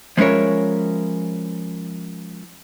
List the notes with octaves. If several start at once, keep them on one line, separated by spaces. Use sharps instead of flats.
F3 G#3 C#4 E4 A#4 C#5